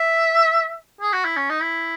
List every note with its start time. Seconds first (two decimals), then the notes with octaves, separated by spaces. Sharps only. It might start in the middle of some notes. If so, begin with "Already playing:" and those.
Already playing: E5
1.01 G#4
1.13 F#4
1.25 E4
1.37 C#4
1.50 D#4
1.62 E4